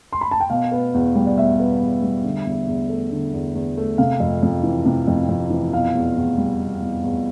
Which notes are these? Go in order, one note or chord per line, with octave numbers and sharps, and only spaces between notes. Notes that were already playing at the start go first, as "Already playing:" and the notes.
C6
B5
A5
G5
B2 F5
B3
E2
G3
D5
B2 E5
B3
E2
G3
D3
E2
E2
A3
D3
E2
E2
A3
C3 F5
F2
F2
E3
C3
F2
F2
E3
B2 F5
E2
E2
G3
B2
E2
E2